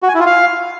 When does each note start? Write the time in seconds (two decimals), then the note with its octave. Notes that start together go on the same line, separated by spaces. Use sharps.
0.03 F#4
0.09 G#5
0.14 E4
0.20 F4
0.26 F5